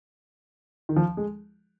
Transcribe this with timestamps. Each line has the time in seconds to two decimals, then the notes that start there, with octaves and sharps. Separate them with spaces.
0.89 D#3
0.96 F3
1.17 G#3